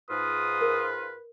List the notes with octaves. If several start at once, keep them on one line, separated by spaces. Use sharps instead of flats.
G#2 F4 B4 D#6
A#4